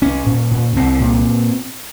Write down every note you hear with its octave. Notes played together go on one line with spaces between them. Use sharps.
C2 C#4
A#2
A#2
C2 C4
A#2